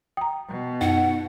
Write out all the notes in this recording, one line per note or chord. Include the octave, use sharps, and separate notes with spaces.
G5 A#5 D#6
B2
F#2 D#4 F#5